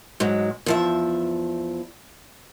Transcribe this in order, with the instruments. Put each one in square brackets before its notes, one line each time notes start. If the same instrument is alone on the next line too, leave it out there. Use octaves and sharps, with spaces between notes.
[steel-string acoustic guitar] G#2 F#3 G#3
E2 F3 E5